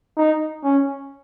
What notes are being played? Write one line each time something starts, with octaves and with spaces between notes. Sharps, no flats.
D#4
C#4